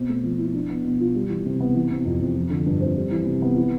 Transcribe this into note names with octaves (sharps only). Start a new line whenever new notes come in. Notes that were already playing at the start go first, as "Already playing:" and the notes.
Already playing: B2 C4
A3
F3
E4
D4
B3
B2
F4
G3
E3
C3
B3
E3
C3
F2
F2
F3
D3
G2
C4
G3
E3
C3
B3
E4